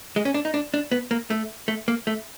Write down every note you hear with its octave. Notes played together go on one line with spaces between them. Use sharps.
G#3
C#4
D4
D#4
D4
D4
B3
A#3
A3
A3
A#3
A3